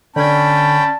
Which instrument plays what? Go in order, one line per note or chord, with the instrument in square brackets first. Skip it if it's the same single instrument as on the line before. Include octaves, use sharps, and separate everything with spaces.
[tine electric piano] D3 G#6 [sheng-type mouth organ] C#4 G5 B5 [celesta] D5 [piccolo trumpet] A5